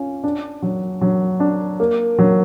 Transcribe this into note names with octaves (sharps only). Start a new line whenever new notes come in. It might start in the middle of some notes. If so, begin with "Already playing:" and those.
Already playing: C#4 F4
D4
F#3
F#3
D4
A#3
F#3